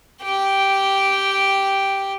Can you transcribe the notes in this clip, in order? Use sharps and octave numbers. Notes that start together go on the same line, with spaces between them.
G4 G5